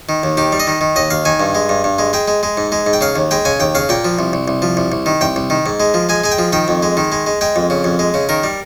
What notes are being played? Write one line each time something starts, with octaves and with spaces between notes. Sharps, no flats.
D#3
D#2
D#3 G4
G3
D#5
D#3
D#3
D#2 D#5
D#2 F5
D#3 G#5
G2
G#3
G2
G2
G#3
G#3 G5
G#3
G#3
G#2
G#3
G#2
G5
C#3 F5
D#2
G#3 G5
C#3 G#5
D#2 G5
C#3 F5
A#2 G5
F3
C2
C2
C2
F3
C2
C2
D#3
C2 G5
C2
D#3
G#2
G#3
F3
G#3 G#5
G#3 G#5
G5
F3
D#3 G5
F2
G#3
D#3
G#3
G#3
G#3 G5
F2
C#3
F2
G#3
C#3
D#3 A#4
G3